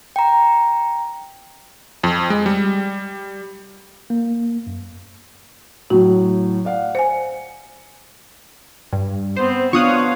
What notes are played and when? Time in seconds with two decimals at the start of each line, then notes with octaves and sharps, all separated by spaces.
0.16 G5 A#5
2.04 F2
2.30 G#3
2.46 G3
4.10 A#3
4.67 F#2
5.90 A2 F#3 F#4
6.65 D5 F5 F#5
6.95 C5 G#5 C#7
8.93 G2
9.36 B3 C4 C5
9.73 B3 D4 F4 C#5 F5 C#6 D#6 F#6